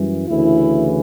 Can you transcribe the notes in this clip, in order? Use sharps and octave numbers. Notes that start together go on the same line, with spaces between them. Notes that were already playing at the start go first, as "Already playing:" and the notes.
Already playing: F#2 E3 G3
D2 C#3 E3 E4